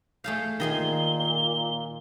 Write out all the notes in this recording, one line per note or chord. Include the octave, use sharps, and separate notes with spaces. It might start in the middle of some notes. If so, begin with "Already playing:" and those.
A3 G#4 F5 G6
A#2 D#3 G#4 C6 G7